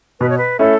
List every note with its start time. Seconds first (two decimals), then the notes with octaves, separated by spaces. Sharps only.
0.20 B2 B4
0.29 C#5
0.38 B4
0.59 A3 C#4 E4 A4